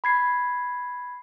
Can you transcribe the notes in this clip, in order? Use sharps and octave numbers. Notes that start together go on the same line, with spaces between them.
B5 G#6 C7